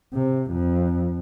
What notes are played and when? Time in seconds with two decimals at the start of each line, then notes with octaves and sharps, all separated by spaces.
0.14 C3
0.52 F2